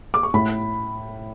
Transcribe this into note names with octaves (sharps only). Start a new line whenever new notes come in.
D6
C#6
A2 B5